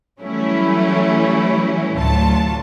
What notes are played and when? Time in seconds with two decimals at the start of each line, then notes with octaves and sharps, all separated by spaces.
0.21 E3 F#3 G3 A3 C#4 E4
1.95 A1 D2 F#3 F4 A5